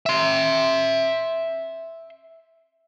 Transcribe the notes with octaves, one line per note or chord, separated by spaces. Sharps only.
E5 C6